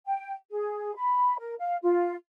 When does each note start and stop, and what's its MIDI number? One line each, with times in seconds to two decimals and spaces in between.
0.06 0.33 79
0.50 0.94 68
0.96 1.38 83
1.39 1.54 70
1.60 1.76 77
1.82 2.14 65